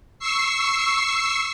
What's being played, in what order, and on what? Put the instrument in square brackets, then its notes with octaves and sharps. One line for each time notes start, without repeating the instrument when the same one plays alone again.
[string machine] C#6 E6 C7